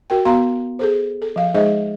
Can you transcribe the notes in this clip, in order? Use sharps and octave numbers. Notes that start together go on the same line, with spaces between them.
F#4 A#4 G5
B3 F#4 F5 A#5 C6
G#4 A4 C5
A4
F3 F5
G#3 D#4 G#4 C5 D#5 E5